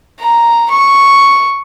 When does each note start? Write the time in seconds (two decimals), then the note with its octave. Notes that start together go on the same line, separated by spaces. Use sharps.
0.20 A#5
0.71 C#6